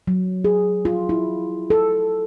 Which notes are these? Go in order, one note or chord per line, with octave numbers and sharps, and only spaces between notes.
F#3
G#4
F4
E4
A4